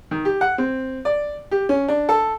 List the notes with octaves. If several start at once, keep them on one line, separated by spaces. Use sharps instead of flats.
D#3
G4
F#5
C4
D5
G4
C#4
D4
A4